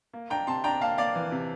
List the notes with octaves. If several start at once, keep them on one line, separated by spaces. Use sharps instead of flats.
A#3
D4 G5 A#5
C3 A5 C6
D4 G5 A#5
A#3 F5 A5
A#3 D5 F5
E3
C3